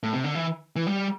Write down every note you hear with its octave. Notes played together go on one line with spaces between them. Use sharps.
A2
C3
D3
E3
E3
G3